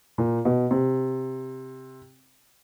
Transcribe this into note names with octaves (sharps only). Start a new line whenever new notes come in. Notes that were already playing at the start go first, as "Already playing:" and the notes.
A#2
B2
C3